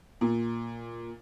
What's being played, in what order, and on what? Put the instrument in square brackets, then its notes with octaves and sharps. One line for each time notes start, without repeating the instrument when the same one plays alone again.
[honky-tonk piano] A#2